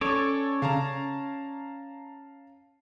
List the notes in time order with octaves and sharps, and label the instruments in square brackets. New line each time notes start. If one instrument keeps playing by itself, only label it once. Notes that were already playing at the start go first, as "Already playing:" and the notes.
[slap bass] C#4 [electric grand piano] A4 [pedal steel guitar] C#5 D5
[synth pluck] C#3 [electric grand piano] F5 A5 A#5